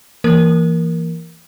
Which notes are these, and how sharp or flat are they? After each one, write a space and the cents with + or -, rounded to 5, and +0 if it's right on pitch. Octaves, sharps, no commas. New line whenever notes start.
E3 +20 A#3 -5 A#4 +0